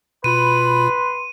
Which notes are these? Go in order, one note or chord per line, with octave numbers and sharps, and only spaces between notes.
B2 F4 B4 B5 C6 D#7